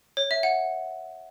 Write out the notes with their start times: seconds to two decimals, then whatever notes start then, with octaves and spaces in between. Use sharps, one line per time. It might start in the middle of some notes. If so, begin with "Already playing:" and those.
0.17 C#5
0.31 E5
0.43 F#5